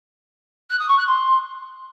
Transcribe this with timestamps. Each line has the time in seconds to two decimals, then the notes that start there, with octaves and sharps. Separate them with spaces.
0.70 F#6
0.79 D#6
0.88 C#6
0.97 F#6
1.07 C6